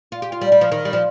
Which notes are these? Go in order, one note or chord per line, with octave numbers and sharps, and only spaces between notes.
F4
G4
F4
G3
G3
F3
D#3
G3
F3